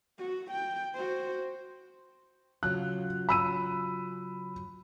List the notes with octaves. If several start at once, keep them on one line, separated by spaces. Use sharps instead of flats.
F#4
G5
F#4 C5
C#3 F#3 F4 F#6
B5 E6 D#7